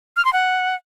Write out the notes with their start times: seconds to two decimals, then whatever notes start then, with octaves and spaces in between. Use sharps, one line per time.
0.17 F6
0.25 C6
0.33 F#5